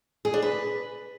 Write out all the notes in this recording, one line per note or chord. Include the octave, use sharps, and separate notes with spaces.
G#4
D4
B4